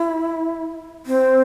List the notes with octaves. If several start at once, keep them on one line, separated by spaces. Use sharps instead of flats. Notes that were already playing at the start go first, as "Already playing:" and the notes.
Already playing: E4
C4